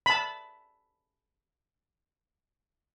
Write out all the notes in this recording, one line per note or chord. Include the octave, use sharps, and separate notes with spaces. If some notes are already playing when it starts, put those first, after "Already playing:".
A5 B5